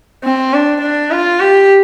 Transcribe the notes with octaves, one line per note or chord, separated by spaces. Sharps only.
C4
D4
D4
F4
G4